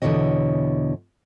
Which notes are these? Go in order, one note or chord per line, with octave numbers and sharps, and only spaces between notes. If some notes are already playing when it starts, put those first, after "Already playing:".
E2 B2 D3 E4 C#5 D#5